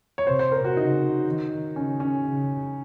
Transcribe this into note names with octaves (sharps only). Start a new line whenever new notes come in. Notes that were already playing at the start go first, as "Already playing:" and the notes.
C#5
C3 C5
C5
A#4
F#4
C#3 D#4
D#3
C#3 C#4
C#4
C#3